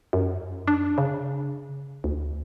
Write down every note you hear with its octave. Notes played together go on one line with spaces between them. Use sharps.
F#2
D4
C#3
D2